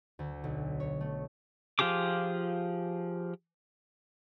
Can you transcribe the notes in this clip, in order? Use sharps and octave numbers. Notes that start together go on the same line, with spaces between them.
D2
B1
C#5
A3
F3 F4 G4 G#4 D6